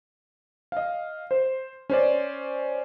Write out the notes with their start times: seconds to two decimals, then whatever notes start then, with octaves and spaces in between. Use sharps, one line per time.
0.72 D#5 F5
1.31 C5
1.90 C#4 C5 D5